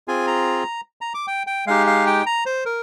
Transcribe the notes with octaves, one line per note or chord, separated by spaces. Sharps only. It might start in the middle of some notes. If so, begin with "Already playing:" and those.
C4 F4 G#4 G#5
A#5
A#5
D6
G5
G5
G#3 D#4 G4 F5
F5
G5
A#5
C5
A#4